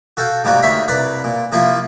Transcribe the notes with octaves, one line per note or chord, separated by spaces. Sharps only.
F#4 A4 F5 G5
G#2 C3 G3 A#3 F4 F#4
D2 D#3 C#5 E5 F5 B5
C2 B4 D5 A#5
A#2
C3 F3 A#3 E4 F4 F5